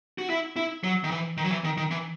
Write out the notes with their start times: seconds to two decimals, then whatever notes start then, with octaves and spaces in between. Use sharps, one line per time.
0.18 F#4
0.30 E4
0.56 E4
0.84 F#3
1.04 D#3
1.11 E3
1.37 D#3
1.44 F#3
1.51 E3
1.64 D#3
1.77 D#3
1.91 E3